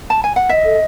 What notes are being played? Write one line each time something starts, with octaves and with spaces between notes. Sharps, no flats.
A5
G#5
F#5
D#5 E5
A4